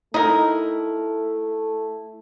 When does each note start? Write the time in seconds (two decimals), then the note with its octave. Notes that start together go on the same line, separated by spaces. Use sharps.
0.14 A3 D#4 E4 A#4 G5